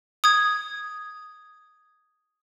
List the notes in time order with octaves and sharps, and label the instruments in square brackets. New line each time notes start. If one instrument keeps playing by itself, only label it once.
[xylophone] D#6 G#6